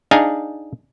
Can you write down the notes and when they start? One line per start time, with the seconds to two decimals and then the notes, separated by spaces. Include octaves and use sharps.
0.11 D4 D#4 G#4 F5 G#5